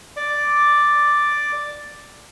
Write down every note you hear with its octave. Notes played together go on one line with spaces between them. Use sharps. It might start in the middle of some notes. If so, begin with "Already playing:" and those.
D5 D6